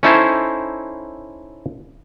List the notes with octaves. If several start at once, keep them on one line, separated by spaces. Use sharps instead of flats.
C#4 D#4 E4 A4 C5 C#5